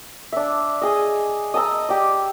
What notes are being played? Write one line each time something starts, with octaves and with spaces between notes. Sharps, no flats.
D4 E5
G#4 D#5
D#5 A5 A#5 E6
G4 D5